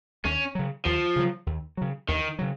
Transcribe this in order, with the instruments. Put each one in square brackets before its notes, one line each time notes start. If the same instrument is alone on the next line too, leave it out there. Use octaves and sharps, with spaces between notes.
[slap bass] D#2 [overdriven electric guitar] C#4
[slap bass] C#3 F#3
[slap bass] D#2 [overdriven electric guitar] F3
[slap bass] C#3 F#3
D#2
C#3 F#3
[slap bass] D#2 [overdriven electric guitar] D#3
[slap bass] C#3 F#3